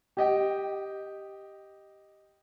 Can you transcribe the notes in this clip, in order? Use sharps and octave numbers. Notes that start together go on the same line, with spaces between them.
G4 D#5 G5